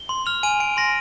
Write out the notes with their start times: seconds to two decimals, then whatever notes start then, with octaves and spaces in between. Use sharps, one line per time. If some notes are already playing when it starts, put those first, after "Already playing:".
Already playing: G7
0.09 C6
0.26 F6 F7
0.43 G#5 D#7
0.60 G#5 D7
0.77 C6 A#6